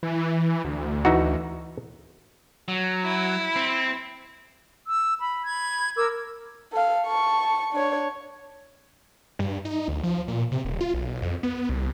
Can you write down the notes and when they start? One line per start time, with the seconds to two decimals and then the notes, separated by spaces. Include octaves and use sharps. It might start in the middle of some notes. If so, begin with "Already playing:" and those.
0.03 E3
0.65 D2
1.05 E3 D#4 F#4
2.68 F#3
3.05 E4
3.56 C4
4.88 E6
5.20 B5
5.46 B5 G#6
5.97 A#4 D6 E6 G#6
6.72 A4 F5
7.07 A5 C#6
7.73 D4 C#5
9.39 G2
9.65 D#4
9.88 D2
10.03 F3
10.28 A#2
10.52 C3
10.65 D#1
10.81 F4
10.94 B1
11.22 F2
11.43 B3
11.69 C2